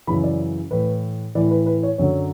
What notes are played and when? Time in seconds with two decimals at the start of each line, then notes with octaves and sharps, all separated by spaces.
0.07 F#2 C#3 E3 B5
0.24 D5
0.71 A2 E3 B4
1.35 A2 E3 D5
1.51 B4
1.66 B4
1.83 C#5
1.98 F#2 D3 F#3 C#5